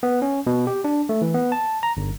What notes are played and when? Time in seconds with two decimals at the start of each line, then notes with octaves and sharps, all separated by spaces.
0.03 B3
0.22 C#4
0.47 B2
0.67 G4
0.84 D4
1.09 A3
1.22 E3
1.34 B3
1.52 A5
1.83 A#5
1.97 G1